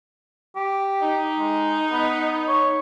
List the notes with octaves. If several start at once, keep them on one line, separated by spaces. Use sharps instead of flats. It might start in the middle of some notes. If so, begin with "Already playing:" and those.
G4
D#4
G#3
B3
C#5